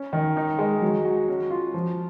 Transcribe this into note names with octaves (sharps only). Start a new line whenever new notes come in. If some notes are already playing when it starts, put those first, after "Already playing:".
Already playing: C#4
D#3
D#4
G#3
F#3
F#4
C#4
F4
F3